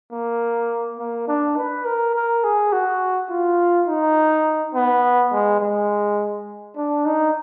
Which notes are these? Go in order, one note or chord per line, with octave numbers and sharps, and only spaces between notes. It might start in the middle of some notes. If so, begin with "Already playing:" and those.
A#3
A#3
D4
B4
A#4
A#4
G#4
F#4
F4
D#4
B3
G#3
G#3
D4
D#4